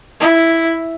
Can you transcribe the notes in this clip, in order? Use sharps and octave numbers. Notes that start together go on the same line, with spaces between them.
E4